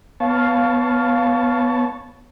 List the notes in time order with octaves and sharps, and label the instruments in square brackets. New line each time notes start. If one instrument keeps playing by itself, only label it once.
[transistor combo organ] B3 C#5 A5 [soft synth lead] F5